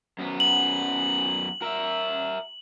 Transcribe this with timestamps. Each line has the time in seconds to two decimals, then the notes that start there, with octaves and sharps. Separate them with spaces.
0.19 F#2 B3
0.40 F#7
1.62 A#4 E5